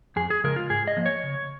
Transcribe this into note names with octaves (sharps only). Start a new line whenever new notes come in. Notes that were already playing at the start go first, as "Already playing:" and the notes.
F2 G#4
G#4
C#3 F3 G#3 A#4
F4
G#2 G#4
D#5
F3 A#3
C#5
C#3